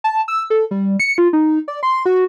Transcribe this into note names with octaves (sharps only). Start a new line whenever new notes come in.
A5
E6
A4
G3
C#7
F4
D#4
D5
C6
F#4